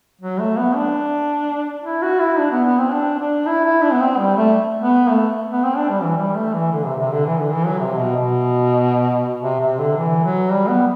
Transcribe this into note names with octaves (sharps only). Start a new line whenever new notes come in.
F#3
A3
B3
D4
E4
F#4
E4
D4
B3
B3
C4
D4
D4
E4
E4
D4
B3
C4
G3
A3
B3
A3
B3
C4
D4
G3
E3
G3
A3
E3
D3
C3
C3
D3
E3
D3
E3
F#3
C3
B2
B2
C3
C3
D3
E3
F#3
G3
B3